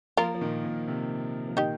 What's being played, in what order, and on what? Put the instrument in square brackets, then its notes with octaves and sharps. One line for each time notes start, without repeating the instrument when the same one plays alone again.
[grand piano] F3 A#3 [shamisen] F4 A#4
[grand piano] F3
A#2 D#3
A#2
C3
F3
[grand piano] A#2 D#3 [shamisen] D#4 G4